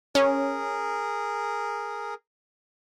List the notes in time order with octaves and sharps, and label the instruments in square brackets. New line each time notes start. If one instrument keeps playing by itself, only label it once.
[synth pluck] C#4 [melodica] G#4 A#4